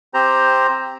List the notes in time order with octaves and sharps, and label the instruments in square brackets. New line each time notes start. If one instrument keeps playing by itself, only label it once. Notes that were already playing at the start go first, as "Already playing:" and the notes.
[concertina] C4 G4 C5 A#5